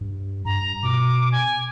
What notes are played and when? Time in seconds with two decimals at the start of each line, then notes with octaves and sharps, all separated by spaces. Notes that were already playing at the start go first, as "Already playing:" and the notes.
0.01 G2
0.45 G2 A#5
0.83 B2 D6
1.32 G#5